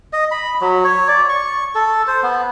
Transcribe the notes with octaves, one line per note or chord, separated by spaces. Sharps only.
D#5
B5
F#3
C#5
D5
C#6
A4
C5
B3